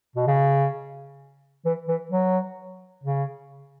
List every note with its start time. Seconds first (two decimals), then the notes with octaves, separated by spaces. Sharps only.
0.16 B2
0.27 C#3
1.66 E3
1.88 E3
2.11 F#3
3.04 C#3